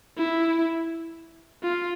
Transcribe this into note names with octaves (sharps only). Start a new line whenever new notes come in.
E4
F4